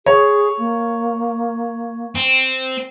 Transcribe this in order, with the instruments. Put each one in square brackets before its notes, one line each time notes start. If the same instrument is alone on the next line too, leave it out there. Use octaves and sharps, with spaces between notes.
[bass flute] G#4 [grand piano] C#5
[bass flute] A#3
[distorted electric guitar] C4